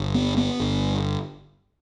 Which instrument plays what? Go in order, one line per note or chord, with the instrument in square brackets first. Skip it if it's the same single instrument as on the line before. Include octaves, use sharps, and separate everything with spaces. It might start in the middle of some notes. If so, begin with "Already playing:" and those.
Already playing: [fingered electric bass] G1
B3
B3
G1